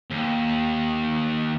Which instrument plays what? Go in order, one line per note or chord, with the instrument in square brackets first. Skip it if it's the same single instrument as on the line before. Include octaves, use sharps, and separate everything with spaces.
[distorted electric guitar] D#2